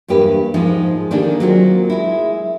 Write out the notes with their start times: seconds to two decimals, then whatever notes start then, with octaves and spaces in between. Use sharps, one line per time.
0.08 E2 G2 A#3 G4 B4
0.54 G#2 F3 G#3 D#4
1.11 D3 D#3 A#3 D4 G4 G#4
1.40 F#3 A#3 C4 F4 F#4
1.90 G#3 E4